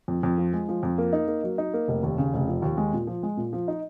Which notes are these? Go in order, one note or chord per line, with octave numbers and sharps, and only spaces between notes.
F2
F2
F3
G#3
F3
F2
A#3
D#4
A#3
F#3
D#4
A#3
F1
D#2
C#3
F1
F3
D#2
G#3
A#2
F3
G#3
A#2
F3
D#4